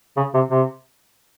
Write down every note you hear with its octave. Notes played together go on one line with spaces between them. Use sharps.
C#3
C3
C3